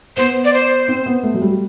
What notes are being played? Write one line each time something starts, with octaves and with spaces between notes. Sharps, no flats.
B3 C5
D5
C5
C4
B3
A3
F#3
G3